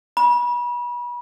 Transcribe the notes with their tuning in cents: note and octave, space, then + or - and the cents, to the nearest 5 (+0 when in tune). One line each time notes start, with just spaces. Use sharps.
B5 -35